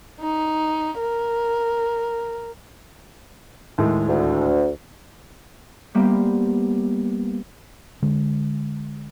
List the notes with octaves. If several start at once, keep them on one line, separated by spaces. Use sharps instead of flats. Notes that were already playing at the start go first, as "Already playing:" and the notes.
D#4
A#4
D#2 A2 G#3
D2
G3 A#3 B3 G4 C5
D3 G#3